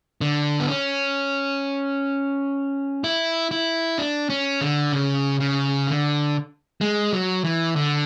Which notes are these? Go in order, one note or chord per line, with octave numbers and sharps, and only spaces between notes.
D3
B3
C#4
E4
E4
D4
C#4
D3
C#3
C#3
D3
G#3
F#3
E3
D3